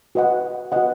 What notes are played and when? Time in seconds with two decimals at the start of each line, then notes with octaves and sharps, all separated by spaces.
0.15 F#4 B4 D#5 F#5
0.72 F#4 B4 D#5 F#5